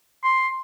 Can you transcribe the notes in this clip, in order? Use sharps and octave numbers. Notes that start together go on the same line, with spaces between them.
C6